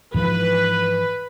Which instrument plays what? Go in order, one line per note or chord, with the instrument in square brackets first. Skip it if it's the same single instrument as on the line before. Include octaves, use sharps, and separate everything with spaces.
[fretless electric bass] G#2 E3 F3 [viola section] B4